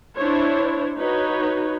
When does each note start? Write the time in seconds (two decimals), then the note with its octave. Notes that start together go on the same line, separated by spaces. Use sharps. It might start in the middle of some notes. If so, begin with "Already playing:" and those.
0.15 D4 E4 C5 C#5
0.98 D#4 F#4 B4 C#5